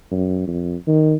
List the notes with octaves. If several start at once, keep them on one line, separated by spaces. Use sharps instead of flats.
F#2
F2
D#3